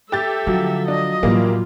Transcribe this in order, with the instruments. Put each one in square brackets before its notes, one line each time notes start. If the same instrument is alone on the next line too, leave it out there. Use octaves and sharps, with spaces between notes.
[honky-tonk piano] G4 G6 A6 [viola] A4 E5
[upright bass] D3 [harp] F3 F#3
[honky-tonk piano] D4 [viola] D#5
[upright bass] A2 F#3 [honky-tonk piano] E3 G3 A#3 [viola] F4